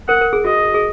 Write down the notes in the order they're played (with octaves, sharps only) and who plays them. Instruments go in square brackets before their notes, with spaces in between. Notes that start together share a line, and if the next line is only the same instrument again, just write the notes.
[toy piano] A#4 [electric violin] F#5
[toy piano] A#4
G#4
[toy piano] F#4 [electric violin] D#5
[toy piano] G#4